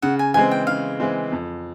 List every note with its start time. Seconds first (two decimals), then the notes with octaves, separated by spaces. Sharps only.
0.02 C#3 F#5
0.19 G#5
0.34 E3 G#3 C4 G#5
0.51 G5
0.67 C#3 F5
1.00 E3 G#3 C4
1.32 F2